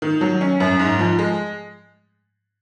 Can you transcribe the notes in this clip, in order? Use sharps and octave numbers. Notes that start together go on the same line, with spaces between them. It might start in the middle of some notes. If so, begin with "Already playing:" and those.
D#3
F#3
C#4
F#2
G#2
F3
G#3